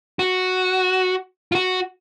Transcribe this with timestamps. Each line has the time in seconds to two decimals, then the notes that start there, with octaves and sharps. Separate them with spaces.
0.19 F#4
1.52 F4
1.55 F#4